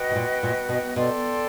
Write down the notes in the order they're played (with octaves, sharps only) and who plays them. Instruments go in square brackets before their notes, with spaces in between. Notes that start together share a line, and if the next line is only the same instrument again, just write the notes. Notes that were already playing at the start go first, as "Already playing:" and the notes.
Already playing: [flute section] F#4 B4 D#5 G5
[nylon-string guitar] B2
A#2
A#2
B2
[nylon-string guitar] B2 [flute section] A4 D5 G5 C6